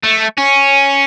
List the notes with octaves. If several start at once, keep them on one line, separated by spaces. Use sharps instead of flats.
A3
C#4